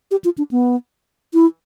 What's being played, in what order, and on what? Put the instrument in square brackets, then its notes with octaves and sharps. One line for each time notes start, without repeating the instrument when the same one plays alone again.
[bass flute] G4
F4
D4
B3
E4